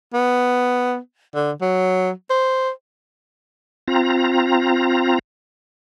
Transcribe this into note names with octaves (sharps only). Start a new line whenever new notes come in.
B3
D3
F#3
C5
C4 F4 A#5